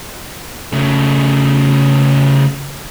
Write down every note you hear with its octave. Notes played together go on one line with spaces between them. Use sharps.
C#3 A3